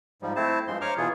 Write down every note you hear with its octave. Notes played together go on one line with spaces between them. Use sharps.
G#2 F3 G3
A3 C4 E4 C5 A5
G2 F3 G#3 C6
C5 C#5 A#5 C#6 D6 F6
B2 E3 F4 G#4